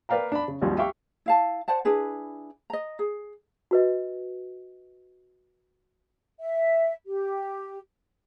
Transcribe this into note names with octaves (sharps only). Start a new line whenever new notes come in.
A#4 B4 D5 F5 G5 A#5
D4 B5
C#3
G#1 D#2 G3 F4 F#4
G4 E5 F5 G5 C#6
E4 F5 A5
C5 D5 F#5 A5
D4 E4 G#4 B4
D#5 A#5
G#4
F#4 B4 D#5
E5
G4